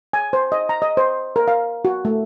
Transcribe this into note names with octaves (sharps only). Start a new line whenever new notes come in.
G#5
C5
D#5
A#5
D#5
C5
A#4
F5
F#4
A3